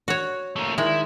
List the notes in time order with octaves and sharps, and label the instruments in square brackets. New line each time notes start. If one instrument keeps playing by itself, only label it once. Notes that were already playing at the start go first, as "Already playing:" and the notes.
[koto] F#4 C#5
[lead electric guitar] A3 A#3
[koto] D#3 G#3 [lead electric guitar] E4